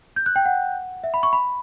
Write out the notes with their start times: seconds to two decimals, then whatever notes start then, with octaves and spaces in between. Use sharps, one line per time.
0.16 G6
0.26 F#6
0.36 G5
0.46 F#5
1.04 E5
1.14 B5
1.23 C#6
1.33 B5